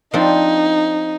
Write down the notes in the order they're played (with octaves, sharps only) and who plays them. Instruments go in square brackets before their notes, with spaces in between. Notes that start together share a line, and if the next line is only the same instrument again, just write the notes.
[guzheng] F3 C4 D4 [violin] D#4